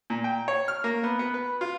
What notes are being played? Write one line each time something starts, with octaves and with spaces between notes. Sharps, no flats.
A#2
G5
C#5
F6
A#3
B3
B3
B4
F4